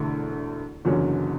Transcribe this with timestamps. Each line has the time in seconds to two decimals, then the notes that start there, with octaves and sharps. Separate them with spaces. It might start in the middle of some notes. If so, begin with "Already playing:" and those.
Already playing: E1 D2 D3 A3 E4
0.85 F#1 E2 D3 F#3 C#4